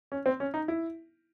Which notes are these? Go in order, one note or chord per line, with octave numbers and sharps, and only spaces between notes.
C#4
C4
C#4
D#4
E4